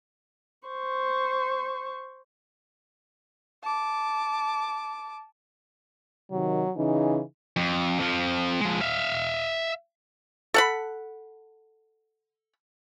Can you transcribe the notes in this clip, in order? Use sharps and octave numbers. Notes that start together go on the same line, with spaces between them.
C5 C#6
A5 D6
C3 D#3 F#3
C#3 E3 D#4
F2
F2 F3
F3 G#3
E5 F5
A4 F#5 B5